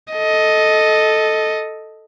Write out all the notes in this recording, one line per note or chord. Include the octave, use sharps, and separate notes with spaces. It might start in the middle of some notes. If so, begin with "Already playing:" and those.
A4 D#5